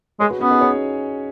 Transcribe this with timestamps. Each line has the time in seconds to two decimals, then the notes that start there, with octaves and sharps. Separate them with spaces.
0.20 G#3 G#4 C#5
0.30 F#4 B4
0.40 B3 C#4 F#4
0.50 D#4 G#4
0.61 G#4 C#5